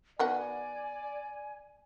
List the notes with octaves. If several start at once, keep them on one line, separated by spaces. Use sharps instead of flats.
D#3 B3 F#4 D5 G#5